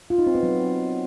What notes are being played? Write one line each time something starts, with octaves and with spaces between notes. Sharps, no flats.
F4
D#4
C4
B3
F#3